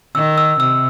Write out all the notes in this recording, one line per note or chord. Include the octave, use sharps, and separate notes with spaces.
D#3 E6
E6
C3 E6